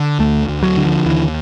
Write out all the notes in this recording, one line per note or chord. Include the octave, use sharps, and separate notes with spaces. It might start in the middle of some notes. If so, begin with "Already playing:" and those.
Already playing: D3
D2 A3
D2
F#3
D3
F3
D#2 E3